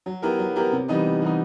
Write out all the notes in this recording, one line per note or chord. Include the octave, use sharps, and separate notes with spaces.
F#3
B3 E4 G4 A#4
F#3
B3 E4 G4 A#4
C3
E3 G3 B3 D#4
C3
E3 G3 B3 D#4